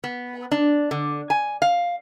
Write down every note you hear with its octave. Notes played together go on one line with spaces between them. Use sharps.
B3
D4
D3
G#5
F5